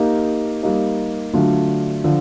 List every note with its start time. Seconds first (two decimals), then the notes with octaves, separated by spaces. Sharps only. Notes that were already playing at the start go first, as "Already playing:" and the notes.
Already playing: A#3 D#4 G4
0.63 G3 A#3 D#4
1.33 D3 F#3 A3 D4 F4
2.04 D3 F3